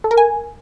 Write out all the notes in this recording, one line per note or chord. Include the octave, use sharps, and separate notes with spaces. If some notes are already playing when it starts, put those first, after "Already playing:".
A4
A#4
G#5